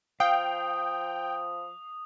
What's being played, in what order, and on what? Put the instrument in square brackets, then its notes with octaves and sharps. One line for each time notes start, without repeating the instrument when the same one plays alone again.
[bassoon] F3 [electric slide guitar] F5 [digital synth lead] G5 [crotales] D#6